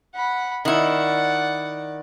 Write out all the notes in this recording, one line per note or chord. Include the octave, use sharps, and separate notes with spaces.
F#5 B5
D#3 E4 D5 F#5